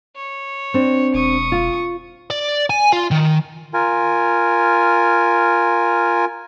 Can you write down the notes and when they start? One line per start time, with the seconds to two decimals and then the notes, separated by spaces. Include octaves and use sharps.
0.16 C#5
0.74 C4 D4
1.14 E1 C#6 D#6
1.52 F4
2.30 D5
2.70 G#5
2.92 F4
3.11 D#3
3.74 F4 A#4 G#5